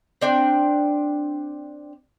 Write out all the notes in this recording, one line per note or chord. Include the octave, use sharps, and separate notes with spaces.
C4 D4 G5